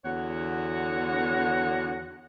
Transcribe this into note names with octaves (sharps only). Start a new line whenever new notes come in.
E2 D3 F#4 C#5 F#5